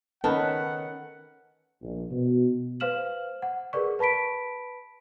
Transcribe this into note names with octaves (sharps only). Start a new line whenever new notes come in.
D#3 C#4 A4 B4 F#5 A5
A#1
B2
B4 C5 F5 F6 E7 F#7
F#5
G#4 A#4 B4 D5 C#6
B4 A5 B5 B6 D7